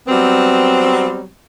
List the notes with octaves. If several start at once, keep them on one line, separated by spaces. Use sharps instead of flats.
F#3 G3 B3 C4